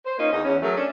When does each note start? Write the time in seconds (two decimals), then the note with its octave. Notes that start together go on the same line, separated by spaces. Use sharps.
0.06 C5
0.18 A#3 C#4 D#4 F4
0.32 E2 D#4 D#5
0.45 E2 C#4
0.61 F#3 A3 G#4 A#4
0.76 C#4 D4